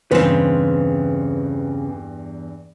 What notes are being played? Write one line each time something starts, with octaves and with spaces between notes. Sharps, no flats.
E2 G2 C#3 C4 B4 C5